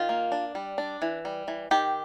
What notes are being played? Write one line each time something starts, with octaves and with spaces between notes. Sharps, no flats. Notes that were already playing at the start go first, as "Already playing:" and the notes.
Already playing: D#3 F4
A#3
D4
G3
D4
E3
G3
E3
D#3 G4